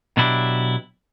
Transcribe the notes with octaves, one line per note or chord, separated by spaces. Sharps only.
B2 F#3 D4 E4 G4